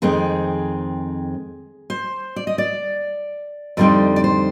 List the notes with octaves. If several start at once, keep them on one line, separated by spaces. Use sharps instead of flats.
F2 D#3 G#3 C4 G#4
C5
D5
D#5
D5
F2 D3 G3 C4 D#4 D5
D5
C5